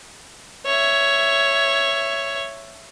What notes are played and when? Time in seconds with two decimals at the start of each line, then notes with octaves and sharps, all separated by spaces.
0.66 C#5 E5